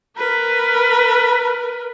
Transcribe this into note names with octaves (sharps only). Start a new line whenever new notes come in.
A#4 B4